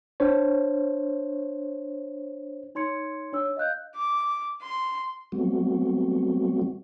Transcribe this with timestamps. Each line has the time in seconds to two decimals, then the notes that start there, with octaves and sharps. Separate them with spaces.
0.20 D4 C5 C#5
2.75 D#4 C#5 C6 G#6 C#7
3.33 D4 C#5 E6
3.57 D#5 F5 F#6 G6
3.95 D6
4.62 C6
5.32 F#3 G3 A3 B3 C4 F#4